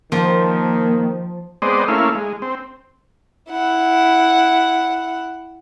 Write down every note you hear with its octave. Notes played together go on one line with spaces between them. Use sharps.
D#3 F3 A#3
G#3 B3 C4 C5 D5 D#5
A3 A#3 C#4 E4 F5
G#3
C4
E4 F#5